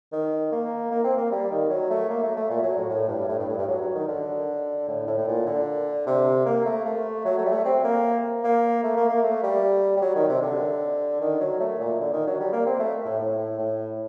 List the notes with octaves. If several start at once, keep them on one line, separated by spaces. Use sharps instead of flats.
D#3
A#3
A#3
C4
A#3
G3
D#3
F#3
A3
A#3
A3
A3
A#2
F#3
A2
A2
G2
A2
G2
A2
G2
F#3
F#3
D#3
D3
A2
A2
A2
A#2
D3
C3
A#3
A3
A3
F#3
A3
G3
A3
C4
A#3
A#3
A3
A#3
A#3
A3
G3
G3
F#3
D#3
C3
D3
D#3
F#3
A3
A#2
D3
D#3
F#3
G3
A#3
C4
A3
A2
A2
A2